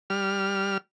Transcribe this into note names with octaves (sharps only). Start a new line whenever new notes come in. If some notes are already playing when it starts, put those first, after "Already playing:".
G3 F6